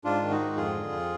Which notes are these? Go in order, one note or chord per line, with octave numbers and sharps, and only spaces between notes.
G#2 D4 F4
D#3
D#4 F#4
G#2
F2 F4 G#4
D3
F2